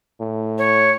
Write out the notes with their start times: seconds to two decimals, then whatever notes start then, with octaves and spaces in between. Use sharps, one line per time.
0.20 A2
0.58 C#5